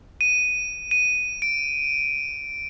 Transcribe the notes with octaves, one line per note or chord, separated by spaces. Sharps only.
D#7
D#7
D7